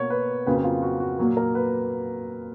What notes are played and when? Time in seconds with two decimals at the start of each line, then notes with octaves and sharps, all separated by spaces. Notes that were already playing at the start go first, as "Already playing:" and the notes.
Already playing: B2 A#3 C#5
0.10 B4
0.46 F2 C#3 F#3 A#3 B4
0.64 F4
0.82 F#4
1.00 F#4
1.19 A#2 F#3 A#3 F#4
1.37 A#4
1.55 B4